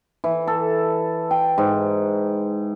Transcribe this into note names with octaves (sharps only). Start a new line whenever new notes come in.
E3
A4
G5
G#2